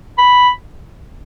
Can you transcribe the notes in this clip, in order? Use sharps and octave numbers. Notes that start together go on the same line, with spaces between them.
B5